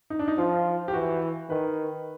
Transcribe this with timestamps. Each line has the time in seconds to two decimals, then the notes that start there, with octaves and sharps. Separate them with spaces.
0.10 D#4
0.19 D4
0.28 D#4
0.38 F3 F4
0.88 G4
0.93 E3 F#4
1.49 D#3 B4